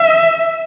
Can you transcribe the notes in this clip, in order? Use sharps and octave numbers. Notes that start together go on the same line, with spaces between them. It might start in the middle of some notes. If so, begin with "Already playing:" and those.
Already playing: E5